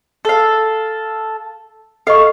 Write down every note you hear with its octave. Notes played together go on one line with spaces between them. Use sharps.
A4 F5
A4 D#5 F5 C#6